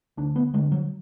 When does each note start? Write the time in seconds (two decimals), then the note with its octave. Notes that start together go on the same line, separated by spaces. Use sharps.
0.17 D2 D4
0.36 B3
0.54 D3 G#3
0.72 F#3